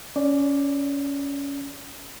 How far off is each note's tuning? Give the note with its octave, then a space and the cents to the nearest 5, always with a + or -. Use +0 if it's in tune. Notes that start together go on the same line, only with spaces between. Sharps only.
C#4 +15 D5 +0